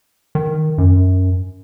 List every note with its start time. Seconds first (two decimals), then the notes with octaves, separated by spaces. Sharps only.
0.35 D#3
0.78 F#2